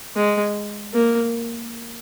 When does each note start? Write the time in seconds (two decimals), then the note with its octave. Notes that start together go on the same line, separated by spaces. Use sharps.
0.16 G#3
0.94 A#3